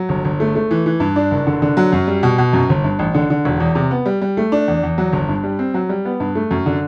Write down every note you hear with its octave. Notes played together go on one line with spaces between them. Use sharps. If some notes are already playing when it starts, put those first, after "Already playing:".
Already playing: F#3
G1
G1
A3
A3
E3
E3
G2
D4
F#1
D3
D3
F#3
F#2
G3
B2
B2
F#2
G1
G2
A1
D3
D3
E1
E2
C3
B3
G3
G3
A3
D4
E2
E2
F#3
G1
G2
G3
C4
F#3
G3
B3
G2
A3
F#2
D3